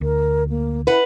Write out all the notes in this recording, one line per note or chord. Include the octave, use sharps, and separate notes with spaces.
D2 A#4
A#3
E4 B4 F#5